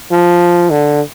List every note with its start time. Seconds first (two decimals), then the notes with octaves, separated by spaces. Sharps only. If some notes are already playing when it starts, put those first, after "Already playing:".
0.12 F3
0.70 D3